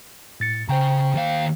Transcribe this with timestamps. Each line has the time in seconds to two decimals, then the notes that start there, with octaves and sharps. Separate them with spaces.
0.40 A2 A6 C#7
0.69 C#3 C5 G5 A#5
1.15 D#2 F5